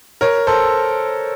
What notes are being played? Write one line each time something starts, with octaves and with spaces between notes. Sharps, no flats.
A#4 C#5
A4 C5